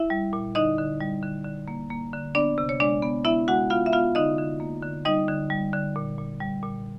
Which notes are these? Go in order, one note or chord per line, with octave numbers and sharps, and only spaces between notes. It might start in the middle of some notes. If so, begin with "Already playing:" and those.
Already playing: E4 E5
G3
A#2
D3 D#4 D#5
D3
G3
D3
D3
A#3
A#3
D3
B3 D4 D5
C3
C#5
G#3 D4 D5
B3
B3 E4 E5
G#3 F#4 F#5
B3 F4 F5
E5
B3 F4 F5
D3 D#4 D#5
D3
A#3
D3
G3 D#4 D#5
D3
G3
D3
A#2
A#2
G3
A#2